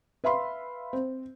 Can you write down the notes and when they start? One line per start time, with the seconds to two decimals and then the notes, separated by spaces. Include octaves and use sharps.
0.24 B4 E5 F5 B5 C6
0.93 C4